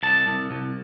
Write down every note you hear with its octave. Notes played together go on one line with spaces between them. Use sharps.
C2 A5
C2
C2